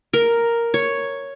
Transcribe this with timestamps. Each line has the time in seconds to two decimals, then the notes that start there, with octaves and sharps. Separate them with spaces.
0.13 A#4
0.74 C#5